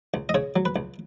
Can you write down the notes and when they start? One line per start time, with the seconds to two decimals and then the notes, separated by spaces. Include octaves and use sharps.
0.14 C#2
0.29 D#5
0.34 C#3 C#5
0.56 F#3
0.65 B4
0.76 C#2